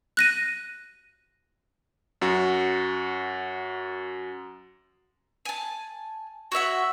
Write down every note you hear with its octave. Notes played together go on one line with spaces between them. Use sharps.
F#6 A#6 D#7
F#2 F#4
G#5 A5
F#4 C#5 E5 F#5